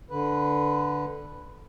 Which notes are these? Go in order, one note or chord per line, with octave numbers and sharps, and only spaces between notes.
D3 B4